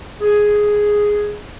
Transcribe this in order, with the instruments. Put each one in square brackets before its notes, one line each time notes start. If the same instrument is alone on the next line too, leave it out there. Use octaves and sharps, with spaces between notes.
[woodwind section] G#4